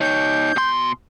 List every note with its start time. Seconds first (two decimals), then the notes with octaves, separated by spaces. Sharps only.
0.01 D#4 C#5 G6
0.56 B2 C6